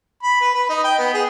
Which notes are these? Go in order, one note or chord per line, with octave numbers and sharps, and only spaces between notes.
B5
B4
B4
D#4
G5
B3
G#4